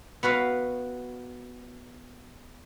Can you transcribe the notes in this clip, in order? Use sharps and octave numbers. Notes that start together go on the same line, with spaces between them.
B3 F#4 B4 F5